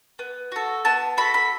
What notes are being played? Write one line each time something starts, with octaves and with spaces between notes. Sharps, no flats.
B3
F#4 A4
B3 A5
F#4 A4 B5
B5